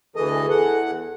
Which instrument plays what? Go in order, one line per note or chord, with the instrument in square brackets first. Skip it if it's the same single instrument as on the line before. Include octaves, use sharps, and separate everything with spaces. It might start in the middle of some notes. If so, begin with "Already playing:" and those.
[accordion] D2 E3 D#5 [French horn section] G#4 A4
[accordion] E2 F#5